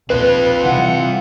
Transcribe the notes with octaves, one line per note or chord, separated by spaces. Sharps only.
A#1 D#2 C4 F4 B4
C3 E3 G3 F#5